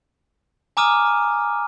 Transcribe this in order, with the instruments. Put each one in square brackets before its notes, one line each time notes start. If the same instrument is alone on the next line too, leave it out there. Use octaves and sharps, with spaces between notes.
[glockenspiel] G#5 A#5 D6 D#6 F6 D#7